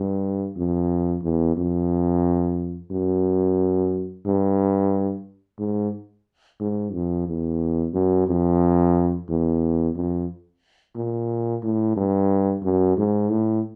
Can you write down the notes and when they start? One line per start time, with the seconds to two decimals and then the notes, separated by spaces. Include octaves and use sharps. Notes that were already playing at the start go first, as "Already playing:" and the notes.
Already playing: G2
0.56 F2
1.23 E2
1.57 F2
2.91 F#2
4.25 G2
5.59 G#2
6.60 G#2
6.93 F2
7.27 E2
7.94 F#2
8.27 F2
9.29 E2
9.95 F2
10.96 A#2
11.63 A2
11.96 G2
12.63 F#2
12.97 G#2
13.31 A2